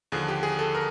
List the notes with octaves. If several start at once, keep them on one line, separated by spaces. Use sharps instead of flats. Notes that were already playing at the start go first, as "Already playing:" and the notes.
D#2 D3 F3 G#4
G4
G#4
A4
A#4